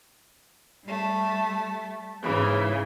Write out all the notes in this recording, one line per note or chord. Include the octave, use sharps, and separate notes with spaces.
G3 A3
G#2 C#3 E3